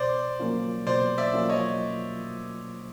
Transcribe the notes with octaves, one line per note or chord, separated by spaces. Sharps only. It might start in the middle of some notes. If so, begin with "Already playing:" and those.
Already playing: B2 C5 D5
F#3 A#3 C#4 F4
B2 C5 D5
D5 E5
F#3 A#3 C#4 F4
C#5 D#5